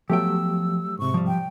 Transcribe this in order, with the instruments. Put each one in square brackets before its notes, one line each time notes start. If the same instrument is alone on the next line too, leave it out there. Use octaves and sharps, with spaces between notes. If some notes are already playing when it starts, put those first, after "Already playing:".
[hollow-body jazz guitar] F3 B3 G5 [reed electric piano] F#3 A3 G4 [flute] E6
[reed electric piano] G#2 C3 [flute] C#6
[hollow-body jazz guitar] F3 G3
[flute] G5